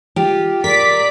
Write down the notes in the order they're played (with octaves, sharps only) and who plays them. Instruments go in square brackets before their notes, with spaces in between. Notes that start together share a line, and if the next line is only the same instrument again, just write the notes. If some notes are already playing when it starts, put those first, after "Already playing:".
[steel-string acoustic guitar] F4 G4
[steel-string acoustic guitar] A#4 [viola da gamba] D5 [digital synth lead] B6